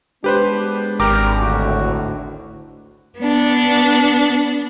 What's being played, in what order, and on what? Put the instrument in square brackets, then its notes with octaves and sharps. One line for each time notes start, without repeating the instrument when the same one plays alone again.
[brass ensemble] G#3 B3 D4 [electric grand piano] G4 B4 C5
[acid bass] G#1 [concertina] G4 A#4 A#5 [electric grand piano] D6
[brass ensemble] D2 A2 [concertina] F#4
[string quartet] B3 D4